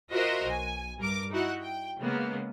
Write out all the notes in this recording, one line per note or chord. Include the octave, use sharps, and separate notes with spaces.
F4 F#4 A#4 C5 D#5 E5
B1 G#5
G2 A#4 D6
D#4 E4 F#4 F#5
G5
C#3 G#3 A#3 B3